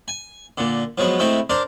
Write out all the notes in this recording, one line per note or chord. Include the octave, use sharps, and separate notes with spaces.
G#5
A#2 D3
F3 F#3 G#3 B3
G#3 A3 C4 E4 C5
D4 A#4 C5 D5